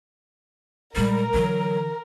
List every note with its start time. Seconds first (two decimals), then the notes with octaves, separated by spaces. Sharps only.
0.96 A#2 G3 G#3 A#4
1.34 D3 E3 F#3